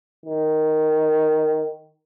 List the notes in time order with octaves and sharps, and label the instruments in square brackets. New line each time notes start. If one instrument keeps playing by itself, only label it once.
[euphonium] D#3